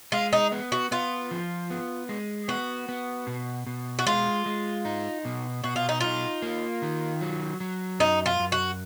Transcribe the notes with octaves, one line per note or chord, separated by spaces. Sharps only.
G#3 F4
D#4
B3
F#4
B3 F4
F3
B3
G#3
B3 F#4
B3
B2
B2
F#4
G#3 F4
G#3
D#4
B2
B2 F#4
F4
D#4
D#4 F4
A#3
D#3
F#3
F#3
F#2 D#4
F4
F#2
F#4